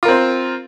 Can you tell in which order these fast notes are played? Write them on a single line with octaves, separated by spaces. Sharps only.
F4 A#4 C4 C5